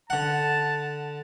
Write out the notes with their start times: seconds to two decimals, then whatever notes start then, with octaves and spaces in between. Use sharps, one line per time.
0.10 D3 F#5 A5